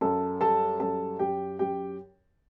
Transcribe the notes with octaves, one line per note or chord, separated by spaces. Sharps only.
F#2 A4 A5
G3 A4 A5
F#2 A4 A5
F#2 G4 G5
F#2 G4 G5